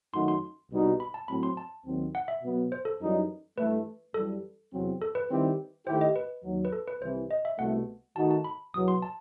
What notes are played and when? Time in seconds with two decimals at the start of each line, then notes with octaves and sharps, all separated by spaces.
0.14 F#2 D#3 A3 D#4 F#4 C6
0.28 C6
0.71 C2 B2 G3 D#4 F#4
1.00 B5
1.14 A5
1.28 A2 F#3 C4 B5
1.43 C6
1.57 A5
1.85 D#2 D#3 F#3 C4
2.15 F#5
2.28 E5
2.43 B2 F#3 B3
2.72 C5
2.85 A4
3.01 F#2 E3 G3 D#4
3.57 G2 E3 A3 B4
4.14 F#2 E3 G3 A4
4.73 E2 C3 F#3 C4
5.02 A4
5.15 B4
5.30 D#3 G3 C4 E4 G4
5.87 D#3 A3 E4 G4 C5
6.01 D#5
6.16 B4
6.44 D#2 D#3 F#3
6.65 B4
6.72 A4
6.87 B4
7.02 C2 C3 E3 C5
7.31 D#5
7.45 E5
7.59 C2 B2 A3 F#5
8.16 D#3 A3 D#4 F#4 A5
8.31 A5
8.44 B5
8.73 E2 B2 F#3 B3 D#6
8.88 C6
9.02 A5